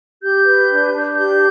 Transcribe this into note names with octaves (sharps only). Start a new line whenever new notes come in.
G4 G6
B4
D4
D4
G4 G6